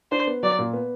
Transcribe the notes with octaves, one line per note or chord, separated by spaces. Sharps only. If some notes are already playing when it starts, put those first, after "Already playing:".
D4 C5
B3
F#3 D5
A#2
B3